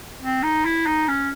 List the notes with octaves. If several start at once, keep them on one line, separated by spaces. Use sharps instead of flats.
C4
D#4
E4
D#4
C#4